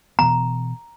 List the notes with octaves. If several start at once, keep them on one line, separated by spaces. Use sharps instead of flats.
B2 E3 B3 A#5